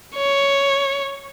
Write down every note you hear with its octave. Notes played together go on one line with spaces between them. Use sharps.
C#5